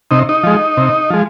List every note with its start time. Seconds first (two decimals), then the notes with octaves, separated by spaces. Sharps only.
0.11 C3 D#4
0.29 D#4
0.43 F3 G#3
0.77 C3
1.10 F3 G#3